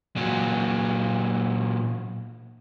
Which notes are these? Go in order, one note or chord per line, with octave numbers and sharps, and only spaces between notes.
A#2 F#3